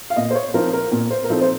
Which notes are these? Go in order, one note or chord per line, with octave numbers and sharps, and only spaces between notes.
F5
A#2 D#5
C5
C#5
F3 C4 D#4 A#4
A#4
A#2
C5
A#4
F3 C4 D#4 A4
C5